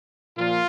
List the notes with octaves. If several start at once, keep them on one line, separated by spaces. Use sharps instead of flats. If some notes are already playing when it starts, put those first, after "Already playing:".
A#2 F3 F4